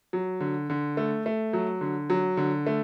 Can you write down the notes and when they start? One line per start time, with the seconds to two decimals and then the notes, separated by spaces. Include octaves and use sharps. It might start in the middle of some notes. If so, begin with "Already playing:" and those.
0.13 F#3
0.41 D3
0.70 D3
0.97 A3
1.26 A3
1.53 F#3
1.81 D3
2.10 F#3
2.37 D3
2.66 A3